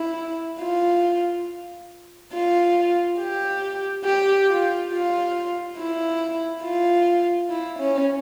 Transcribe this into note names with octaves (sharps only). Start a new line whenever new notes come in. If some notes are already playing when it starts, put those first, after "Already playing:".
Already playing: E4
F4
F4
G4
G4
F4
F4
E4
F4
E4
C#4